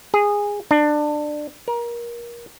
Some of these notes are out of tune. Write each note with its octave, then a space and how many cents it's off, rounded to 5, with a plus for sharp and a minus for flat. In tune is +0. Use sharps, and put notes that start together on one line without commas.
G#4 -15
D4 +25
A#4 +25